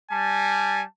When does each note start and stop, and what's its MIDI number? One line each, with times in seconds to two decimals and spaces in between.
0.11 0.82 55
0.11 0.82 80
0.11 0.85 81